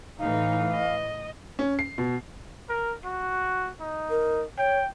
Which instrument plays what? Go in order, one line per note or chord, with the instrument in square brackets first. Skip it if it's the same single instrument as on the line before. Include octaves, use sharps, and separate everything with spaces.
[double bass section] A2 E3 [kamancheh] D#4 [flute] F5
[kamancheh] D#5
[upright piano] C#4
C7
B2
[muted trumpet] A#4
F#4
D#4
[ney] A#4
[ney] C#5 [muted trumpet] G5